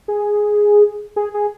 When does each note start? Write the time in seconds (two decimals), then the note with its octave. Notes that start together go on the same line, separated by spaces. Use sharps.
0.08 G#4
1.16 G#4
1.34 G#4